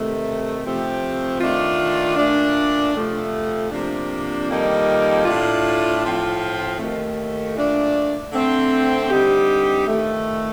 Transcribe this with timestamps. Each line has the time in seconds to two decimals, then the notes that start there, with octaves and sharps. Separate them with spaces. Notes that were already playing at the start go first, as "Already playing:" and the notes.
Already playing: C3 D#3 A3
0.63 C3 F3 A3 C4 G4
1.41 D#3 A3 D4 F4
2.17 A#2 A3 D4
2.94 F2 C3 F3 A3
3.71 C3 F3 A#3 D4
4.49 F2 D#3 G3 A#3 D#4
5.26 A2 A3 D4 F4
6.03 A2 F3 C4 F4
6.79 D#2 D#3 A3
7.56 A#2 A3 D4
8.33 D3 A3 C4
9.10 D3 G3 C4 D#4 G4
9.87 F2 D#3 A3